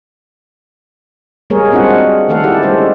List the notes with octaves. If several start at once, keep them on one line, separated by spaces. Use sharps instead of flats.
G3 G#3 A#3 G#4 A#4 C#5
G#3 C4 D4 F4 F#4 F#5
D#3 G#3 A3 A4 F5 F#5
E4 G4 A4 D5
G3 G#3 C#4 G4 C5